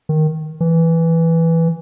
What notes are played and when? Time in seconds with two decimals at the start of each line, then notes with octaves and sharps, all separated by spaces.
0.09 D#3
0.61 E3